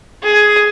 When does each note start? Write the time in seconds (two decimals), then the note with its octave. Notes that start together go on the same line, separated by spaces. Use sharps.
0.23 G#4